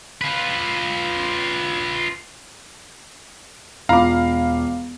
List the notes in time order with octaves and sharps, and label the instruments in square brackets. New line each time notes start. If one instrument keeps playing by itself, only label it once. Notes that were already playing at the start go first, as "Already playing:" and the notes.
[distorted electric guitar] F4 B4
[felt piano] E1 F4 D6 [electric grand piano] F5 A#5 B5